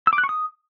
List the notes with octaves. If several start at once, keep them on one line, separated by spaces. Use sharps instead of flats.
E6
D6
F#6
C#6
D#6